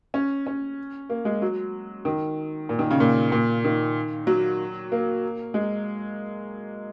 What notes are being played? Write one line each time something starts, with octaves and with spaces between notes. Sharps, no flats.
C#4
C#4
A#3
G#3
F#3
D#3
A#2
D#3
C#3
A#2
A#2
D#3
F#3
A#3
G#3